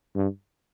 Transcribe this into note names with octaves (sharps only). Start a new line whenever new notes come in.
G2